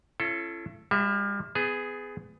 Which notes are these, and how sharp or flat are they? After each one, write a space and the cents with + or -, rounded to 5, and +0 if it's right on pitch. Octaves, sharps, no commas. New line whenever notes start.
C#4 -20 E4 +45 A4 +0
G3 +40 F#4 +0 E5 +0
B3 +30 G#4 +0